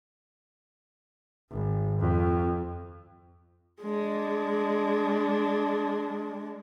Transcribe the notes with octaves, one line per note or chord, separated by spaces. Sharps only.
G#1
F2
G#3 D4